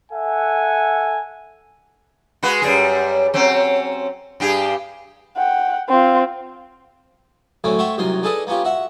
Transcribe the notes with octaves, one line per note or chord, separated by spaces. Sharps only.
A4 E5 F#5 G#5
G#3 F#4 B4
F#2 G3 G#4
F#3 C4 C#4
G2 G4 G#4
F#5 G5
C4 F4
A2 D3 F#3 A3 C4 C#4
A3 C5 C#5 E5 F#5 G5
C2 F#2 D#3 F#3 A#4 C6
D#4 G#4 A4 B4 D5 D#5
A#3 B3 C#4 F4 G4
F#4 E5 F#5